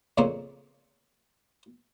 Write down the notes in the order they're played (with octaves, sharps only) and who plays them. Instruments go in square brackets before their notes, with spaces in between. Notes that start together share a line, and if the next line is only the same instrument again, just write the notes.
[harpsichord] F2 A#2 C#3 A#3 C4 C#4